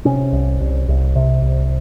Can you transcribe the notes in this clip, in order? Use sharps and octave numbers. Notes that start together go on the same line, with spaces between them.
C3 C#4
C2
C2
C2
C3
C2